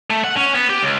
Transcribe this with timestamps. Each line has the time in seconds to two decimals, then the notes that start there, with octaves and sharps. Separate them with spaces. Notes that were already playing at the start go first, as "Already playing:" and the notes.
0.10 A3
0.24 F#5
0.37 C#4
0.54 B3
0.70 G4
0.83 C#2